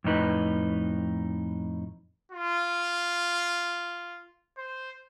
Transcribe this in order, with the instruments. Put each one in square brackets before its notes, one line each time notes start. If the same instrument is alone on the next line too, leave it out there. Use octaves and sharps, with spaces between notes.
[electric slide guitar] F2 A2 D#4 B4
[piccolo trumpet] F4
C5